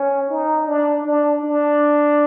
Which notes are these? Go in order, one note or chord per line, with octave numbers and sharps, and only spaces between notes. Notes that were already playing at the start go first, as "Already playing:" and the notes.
Already playing: C#4
D#4
D4
D4
D4